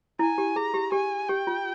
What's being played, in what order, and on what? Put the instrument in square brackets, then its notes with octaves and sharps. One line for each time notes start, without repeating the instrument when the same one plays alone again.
[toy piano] E4 [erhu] G#5
[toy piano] G4
[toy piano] G#4 [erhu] A#5
[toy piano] G4
[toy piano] G4 [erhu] G#5
[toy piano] G4 [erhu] G5
[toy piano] F4